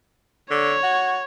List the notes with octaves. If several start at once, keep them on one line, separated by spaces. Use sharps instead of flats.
D3 C#5
F#4